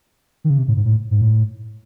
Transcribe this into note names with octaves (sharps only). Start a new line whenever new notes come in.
D#3
C#3
C3
A2
G#2
A2
G#2
A2